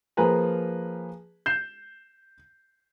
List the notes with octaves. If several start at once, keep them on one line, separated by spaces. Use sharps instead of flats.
F3 A#3 G#4 B4 G#5 A#5
G6 C7 E7